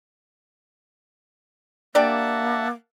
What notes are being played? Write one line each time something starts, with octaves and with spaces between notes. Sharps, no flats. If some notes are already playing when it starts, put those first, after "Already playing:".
A#3 D4 G4 D5 E5 F#5 A5